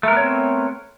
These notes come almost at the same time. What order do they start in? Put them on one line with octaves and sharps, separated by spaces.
A3 A#4 B3 C#5 C4